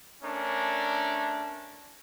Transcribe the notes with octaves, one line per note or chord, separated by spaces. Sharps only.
A3 C#4 D4 A#4